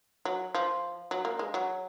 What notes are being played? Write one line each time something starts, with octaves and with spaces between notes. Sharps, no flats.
F#3
F3
F#3
A#3
G#3
F#3